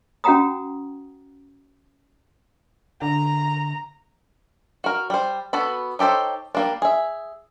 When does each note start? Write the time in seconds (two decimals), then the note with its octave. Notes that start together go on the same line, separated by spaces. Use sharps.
0.24 C#4 F#4 F#5 G5 A#5 D#6
3.02 D3 A#5
4.84 F#4 A#4
5.10 G3 C5
5.53 B3 F#4 A4 B5
5.99 D#4 G4 A4 C5 C#5
6.55 G3 A#3 D4
6.82 G#4 E5